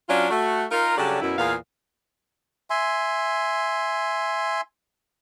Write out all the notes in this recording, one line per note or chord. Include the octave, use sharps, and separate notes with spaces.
F#3 C#4 D4 F4
A3 F#4
D#4 F4 A#4
C#3 F#3 G3 D4 G4 A4
F#2 B2 E4
E2 A#2 G#4 F5
E5 G#5 C6